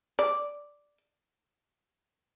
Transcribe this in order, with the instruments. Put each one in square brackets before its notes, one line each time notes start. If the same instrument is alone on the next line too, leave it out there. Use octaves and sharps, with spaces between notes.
[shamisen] D5